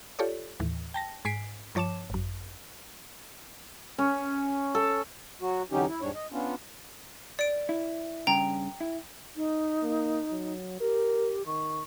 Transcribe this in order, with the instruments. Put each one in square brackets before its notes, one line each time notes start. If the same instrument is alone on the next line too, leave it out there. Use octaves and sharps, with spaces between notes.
[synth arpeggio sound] F4 G4 A4 C#5 D5
D#2 A2 E3
G5 A5 A#6
G#2 G#5 B6 C7 D7
G2 F3 C#5 A5 D6 E7
G#1 F#2
[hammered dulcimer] C#4
A4
[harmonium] F#3 F#4
E2 D3 F#3 C#4 D#4 G4
E4
E2 G#2 G3 D4 C#5
D#5
B3 C#4 D4 F4
[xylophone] D5 D7
[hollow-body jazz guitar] E4
[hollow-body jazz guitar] G2 C#3 [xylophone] G5 A#5
[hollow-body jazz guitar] E4
[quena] D#4
[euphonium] A#3
F#3
[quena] G4 [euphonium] A#4
[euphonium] D#3 [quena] C#6